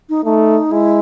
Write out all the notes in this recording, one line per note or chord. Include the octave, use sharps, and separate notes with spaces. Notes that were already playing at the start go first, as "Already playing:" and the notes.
D#4
A3 D#4
G#3 E4